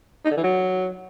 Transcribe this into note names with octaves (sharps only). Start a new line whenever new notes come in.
D#4
D3
E3
F#3